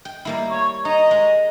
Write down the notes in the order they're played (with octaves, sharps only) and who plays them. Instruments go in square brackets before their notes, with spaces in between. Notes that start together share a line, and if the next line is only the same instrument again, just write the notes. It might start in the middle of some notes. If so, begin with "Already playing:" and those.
[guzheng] G5
G3 A#3 E4
[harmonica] C#5 C#6
[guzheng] D#4 [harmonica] D#5 A#5
[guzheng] G#3